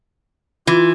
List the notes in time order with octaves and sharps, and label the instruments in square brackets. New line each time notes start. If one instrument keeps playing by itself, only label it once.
[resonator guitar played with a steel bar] E3 [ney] F4